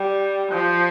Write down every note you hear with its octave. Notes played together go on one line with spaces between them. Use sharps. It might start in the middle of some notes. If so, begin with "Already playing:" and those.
Already playing: G3
F3